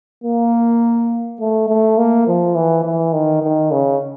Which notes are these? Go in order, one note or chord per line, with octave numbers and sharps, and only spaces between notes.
A#3
A3
A3
A#3
F3
E3
E3
D#3
D#3
C#3